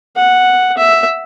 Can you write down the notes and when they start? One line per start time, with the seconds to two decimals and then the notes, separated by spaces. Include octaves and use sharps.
0.16 F#5
0.77 E5